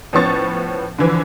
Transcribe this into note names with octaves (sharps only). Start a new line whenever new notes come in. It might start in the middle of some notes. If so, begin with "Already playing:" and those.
A2 F3 B3 C#4 C#6 A6
D3 E3 F3